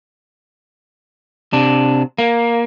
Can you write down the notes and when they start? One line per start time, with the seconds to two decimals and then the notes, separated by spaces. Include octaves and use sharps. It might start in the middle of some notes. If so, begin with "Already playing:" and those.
1.53 C3 D4
2.18 A#3